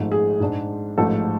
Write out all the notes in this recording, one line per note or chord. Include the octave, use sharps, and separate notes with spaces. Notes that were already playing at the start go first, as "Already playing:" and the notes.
Already playing: G#1 G#2 F3 A3
G#4
G#2 G#3 D4
A1 G#2 F3 A3 A4